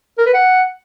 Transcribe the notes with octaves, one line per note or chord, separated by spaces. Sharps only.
A#4
B4
F#5